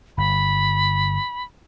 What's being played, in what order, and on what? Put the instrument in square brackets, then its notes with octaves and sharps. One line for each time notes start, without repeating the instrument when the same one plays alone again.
[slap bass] G1 [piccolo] B5